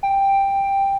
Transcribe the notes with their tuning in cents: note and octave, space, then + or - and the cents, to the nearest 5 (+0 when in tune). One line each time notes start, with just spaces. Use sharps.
G5 +5